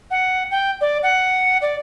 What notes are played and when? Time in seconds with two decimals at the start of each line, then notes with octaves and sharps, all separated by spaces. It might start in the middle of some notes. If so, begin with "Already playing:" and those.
0.10 F#5
0.50 G5
0.81 D5
1.02 F#5
1.61 D5